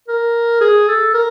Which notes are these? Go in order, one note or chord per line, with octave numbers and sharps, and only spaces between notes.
A#4
G#4
A4
A#4